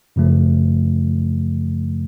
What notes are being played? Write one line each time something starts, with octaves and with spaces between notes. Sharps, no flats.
F#2 C#3 F3 A3